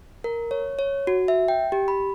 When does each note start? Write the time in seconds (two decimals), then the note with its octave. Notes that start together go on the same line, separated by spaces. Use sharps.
0.24 A#4
0.51 C#5
0.79 C#5
1.07 F#4
1.28 E5
1.48 G5
1.72 G4
1.88 B5